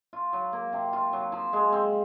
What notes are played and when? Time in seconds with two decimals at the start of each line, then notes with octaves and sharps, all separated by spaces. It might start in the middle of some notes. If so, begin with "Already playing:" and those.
0.13 F4
0.33 F#3
0.53 A#3
0.73 C3
0.93 F4
1.13 F#3
1.32 F3
1.53 G#3
1.72 C4